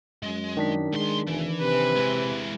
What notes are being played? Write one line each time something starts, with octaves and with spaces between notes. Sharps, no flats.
F#2 G#3
D#3 D4 B6
B1 G#3 C6
F1 E3
C3 B4
E3 G#3